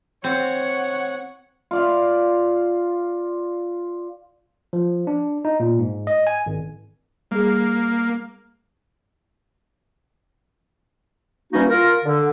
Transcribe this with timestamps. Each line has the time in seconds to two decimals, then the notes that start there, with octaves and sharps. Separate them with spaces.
0.24 C4 C#5 F#5
1.71 F4 D5 F5
4.73 F3
5.07 D4
5.45 D#4
5.60 A#2
5.79 G#2
6.07 D#5
6.27 G#5
6.46 G#1
7.31 G3 A#3 G#4
11.53 E3 G3 A#3 C#4 D#4 F#4
11.68 F4 A#4
12.05 D3